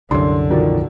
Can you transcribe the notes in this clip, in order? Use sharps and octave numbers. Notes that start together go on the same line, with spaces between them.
C2 F#2 D3 D4 D5 C6
B2 D#3 F3 F#4 D5